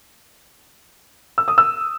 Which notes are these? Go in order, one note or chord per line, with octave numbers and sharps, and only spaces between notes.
E6
D#6
E6